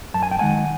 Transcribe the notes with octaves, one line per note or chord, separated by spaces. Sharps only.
F#2 A5
G#5
G5
D#3 G#3 F#5 G#5